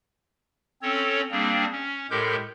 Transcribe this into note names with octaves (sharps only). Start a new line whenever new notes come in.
C4 C#4 A4 C#5
G3 A#3 C4 D4 G#4
C#4
A2 G#3 G4 A4 A#4 G6